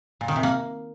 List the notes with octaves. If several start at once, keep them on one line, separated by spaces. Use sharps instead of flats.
A#2
D#3
C3
A#3